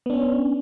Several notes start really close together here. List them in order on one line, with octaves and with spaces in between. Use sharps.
B3 D4 C#4